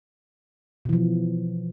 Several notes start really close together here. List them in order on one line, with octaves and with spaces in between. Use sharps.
B2 E3 F3